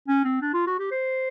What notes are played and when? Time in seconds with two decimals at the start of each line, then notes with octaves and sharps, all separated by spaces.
0.08 C#4
0.24 C4
0.42 D4
0.53 F4
0.67 F#4
0.79 G4
0.91 C5